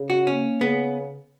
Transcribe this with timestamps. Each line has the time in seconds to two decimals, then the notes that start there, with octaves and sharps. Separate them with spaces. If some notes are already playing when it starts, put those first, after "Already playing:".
Already playing: C#3
0.10 F#4
0.27 A#3 C#4
0.61 C#3 B3